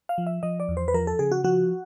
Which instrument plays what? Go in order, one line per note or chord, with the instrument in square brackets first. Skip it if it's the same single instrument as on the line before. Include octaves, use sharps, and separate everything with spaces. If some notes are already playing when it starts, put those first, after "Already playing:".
[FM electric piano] F5
F3
E5
F3 D#5
D5
E2
C5
B4
F3 A#4
A4
C#3 G#4
F#4
F3 F#4